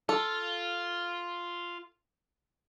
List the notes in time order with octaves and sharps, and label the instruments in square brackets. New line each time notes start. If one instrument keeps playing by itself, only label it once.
[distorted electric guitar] F4 [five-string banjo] A4